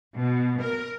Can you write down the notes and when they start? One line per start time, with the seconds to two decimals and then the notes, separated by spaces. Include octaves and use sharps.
0.16 B2
0.61 A#4